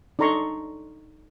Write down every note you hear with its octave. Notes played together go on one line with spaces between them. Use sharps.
D4 D#4 A4 A#5 C6 C#6